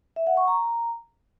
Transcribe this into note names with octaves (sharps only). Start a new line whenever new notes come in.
E5
F#5
C#6
A#5